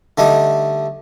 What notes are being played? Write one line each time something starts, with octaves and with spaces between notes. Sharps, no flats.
D3 G3 A3 D#4 D#5